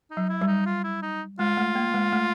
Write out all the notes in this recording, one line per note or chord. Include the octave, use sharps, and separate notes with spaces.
D#4
F#3
E4
G3
D#4
F4
E4
D#4
G#3 F4
A3
A#3
G#3
A3